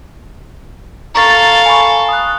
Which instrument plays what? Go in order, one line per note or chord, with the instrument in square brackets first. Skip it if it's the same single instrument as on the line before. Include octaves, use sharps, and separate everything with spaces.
[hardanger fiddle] A4 F5 [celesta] A#5 C#6 A6
[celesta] G#5 B5 C#6
D#6 F#6